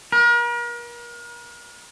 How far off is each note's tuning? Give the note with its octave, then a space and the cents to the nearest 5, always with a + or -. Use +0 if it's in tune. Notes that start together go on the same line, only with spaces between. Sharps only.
A#4 +40